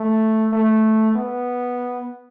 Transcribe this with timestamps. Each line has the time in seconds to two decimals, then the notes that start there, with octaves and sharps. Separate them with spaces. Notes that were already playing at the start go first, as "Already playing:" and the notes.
Already playing: A3
0.52 A3
1.16 B3